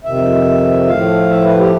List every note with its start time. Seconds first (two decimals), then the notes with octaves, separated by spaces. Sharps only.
0.05 F2 C3 D#3 E5
0.88 A2 F3 A3 F5
1.30 E5
1.44 B4
1.58 G4